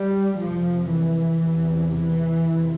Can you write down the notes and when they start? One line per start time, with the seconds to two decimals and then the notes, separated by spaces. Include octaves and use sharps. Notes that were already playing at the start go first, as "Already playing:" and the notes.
Already playing: G3
0.39 F2 C3 F3
0.91 E3
1.42 E2 C3
1.92 E3
2.43 F2 C3